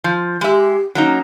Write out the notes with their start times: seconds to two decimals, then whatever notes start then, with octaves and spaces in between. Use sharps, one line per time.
0.04 F3
0.41 G#3 G4 E5
0.95 F#3 A#3 C#4 D#4